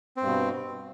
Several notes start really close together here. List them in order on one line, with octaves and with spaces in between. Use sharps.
C4 G2 B2